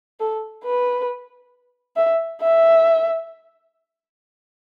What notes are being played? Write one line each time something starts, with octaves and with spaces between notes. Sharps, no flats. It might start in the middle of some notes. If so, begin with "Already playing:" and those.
A4
B4
E5
E5